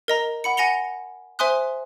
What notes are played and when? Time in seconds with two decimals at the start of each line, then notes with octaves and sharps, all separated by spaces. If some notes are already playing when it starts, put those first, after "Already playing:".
0.08 A#4 D#5 A#5
0.44 F#5 B5 C#7
0.57 F#5 G#5 A#6 C#7 F7 G7
1.39 C5 E5 G#5 C6 D#6 F#6